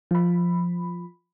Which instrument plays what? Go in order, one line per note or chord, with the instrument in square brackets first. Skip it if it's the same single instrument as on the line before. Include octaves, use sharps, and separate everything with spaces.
[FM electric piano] F3 B5